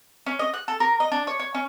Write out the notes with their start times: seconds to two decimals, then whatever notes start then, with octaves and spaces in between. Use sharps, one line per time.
0.26 C#4
0.39 D#5
0.54 F#6
0.68 A4
0.80 A#4
1.00 D#5
1.12 D4
1.27 C#5
1.39 C#5
1.55 C#4